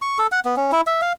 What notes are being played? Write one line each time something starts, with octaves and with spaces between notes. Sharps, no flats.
C#6
A4
F#5
B3
C#4
E4
E5
F5